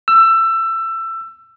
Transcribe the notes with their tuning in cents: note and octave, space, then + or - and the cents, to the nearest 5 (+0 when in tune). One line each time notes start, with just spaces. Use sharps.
E6 +20